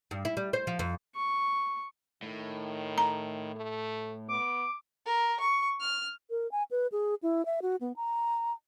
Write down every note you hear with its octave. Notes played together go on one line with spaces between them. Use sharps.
G2
E4
G3
C5
F3
F2
C#6
A2 D#3
A#5
A3
B3 D6
A#4
C#6
F6
A#4
G#5
B4
G#4
E4
E5
F#4
B3
A#5